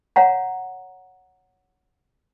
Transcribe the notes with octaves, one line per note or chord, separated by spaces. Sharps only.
C#5 F5 F#5 A#5